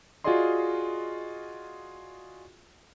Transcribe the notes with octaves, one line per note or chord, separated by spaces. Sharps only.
F4 F#4 G#4 D5 D#5 C6